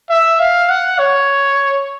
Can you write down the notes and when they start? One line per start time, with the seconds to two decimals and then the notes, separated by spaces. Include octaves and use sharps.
0.09 E5
0.40 F5
0.69 F#5
0.98 C#5